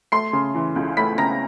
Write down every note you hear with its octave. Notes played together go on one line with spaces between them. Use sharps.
A3 C6 C7
C#3
E3
C#2
A3 B5 B6
C#3 A#5 A#6